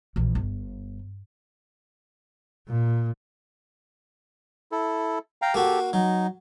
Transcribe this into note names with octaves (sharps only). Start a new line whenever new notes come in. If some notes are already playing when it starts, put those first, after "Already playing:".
A#1 E3
G1
A#2
E4 A4
F5 G5 A#5
A#3 F#4 G4 A4
F#3 D#4